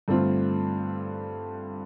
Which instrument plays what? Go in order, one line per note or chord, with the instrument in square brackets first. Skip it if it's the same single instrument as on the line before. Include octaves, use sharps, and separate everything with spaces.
[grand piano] G2 D3 A3 C4 F4